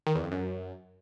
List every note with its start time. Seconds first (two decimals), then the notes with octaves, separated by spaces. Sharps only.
0.07 D#3
0.15 E2
0.23 F2
0.32 F#2